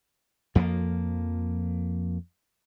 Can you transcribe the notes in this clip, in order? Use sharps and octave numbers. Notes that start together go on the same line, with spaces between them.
F2 F3 F#3 A#3